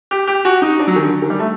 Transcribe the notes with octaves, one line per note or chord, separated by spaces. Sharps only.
G4
G4
F#4
D#4
D4
F#3
D#3
D3
D#3
G3
A3